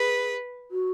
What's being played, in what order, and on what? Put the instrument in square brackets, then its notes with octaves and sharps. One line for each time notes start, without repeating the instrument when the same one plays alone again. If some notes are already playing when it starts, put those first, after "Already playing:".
Already playing: [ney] G#4 [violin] B4
[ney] F#4